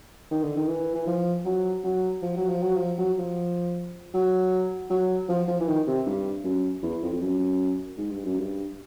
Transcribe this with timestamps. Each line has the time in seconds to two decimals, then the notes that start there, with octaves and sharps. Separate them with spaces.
0.31 D#3
0.43 D3
0.56 D#3
0.68 E3
0.95 E3
1.07 F3
1.46 F#3
1.84 F#3
2.22 F3
2.37 F#3
2.49 F3
2.63 F#3
2.77 F3
2.98 F#3
3.18 F3
4.14 F#3
4.90 F#3
5.29 F3
5.48 F3
5.60 E3
5.68 D#3
5.87 C3
6.06 G2
6.44 F#2
6.82 E2
7.02 F2
7.12 F2
7.21 F#2
7.98 G#2
8.11 G2
8.25 F#2
8.39 G2